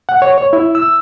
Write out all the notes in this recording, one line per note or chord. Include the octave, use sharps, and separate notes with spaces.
F#5
C#5
C#5
E4
E6